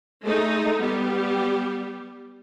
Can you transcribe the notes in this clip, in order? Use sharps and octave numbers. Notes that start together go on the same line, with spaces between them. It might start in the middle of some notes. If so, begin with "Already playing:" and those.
G#3 A3 D#4
G3 B3 G4